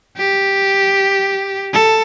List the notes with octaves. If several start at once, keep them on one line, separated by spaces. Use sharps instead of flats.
G4
A4